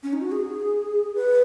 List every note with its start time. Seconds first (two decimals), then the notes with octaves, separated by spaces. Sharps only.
0.03 C#4
0.13 D#4
0.21 F#4
0.32 G#4
1.15 B4